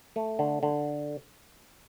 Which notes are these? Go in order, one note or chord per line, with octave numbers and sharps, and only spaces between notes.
A3
D3
D3